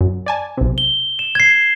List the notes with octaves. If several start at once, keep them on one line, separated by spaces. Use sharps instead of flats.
F#2
D5 G#5 A5
B1 C3
G7
E7
G#6 C7